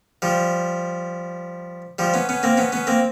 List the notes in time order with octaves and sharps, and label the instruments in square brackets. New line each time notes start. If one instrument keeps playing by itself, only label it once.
[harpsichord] F3 G3
F3 G3
B3 C#4
B3 C#4
A#3 C4
B3 C#4
B3 C#4
A#3 C4